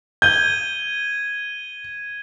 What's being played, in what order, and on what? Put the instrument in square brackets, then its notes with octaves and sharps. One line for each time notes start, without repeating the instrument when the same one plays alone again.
[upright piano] G6 [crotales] G#6 D#7 G7